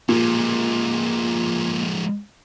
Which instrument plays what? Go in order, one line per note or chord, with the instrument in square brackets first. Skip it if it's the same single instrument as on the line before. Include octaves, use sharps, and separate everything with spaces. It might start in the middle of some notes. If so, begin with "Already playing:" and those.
[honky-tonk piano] A#2 [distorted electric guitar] F3 G#3